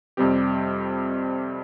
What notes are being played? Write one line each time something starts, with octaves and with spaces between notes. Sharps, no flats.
F2 C3 G3 C4 G4